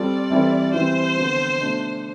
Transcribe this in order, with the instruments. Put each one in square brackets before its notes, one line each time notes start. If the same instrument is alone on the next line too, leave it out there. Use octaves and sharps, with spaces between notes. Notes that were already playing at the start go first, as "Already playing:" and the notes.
Already playing: [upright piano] G3 C4 F4 A4 [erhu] D5
[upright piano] E3 G3 C4 E4 A4
[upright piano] E3 G3 C4 [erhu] C5
[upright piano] D3 F3 B3
B2 A3 D4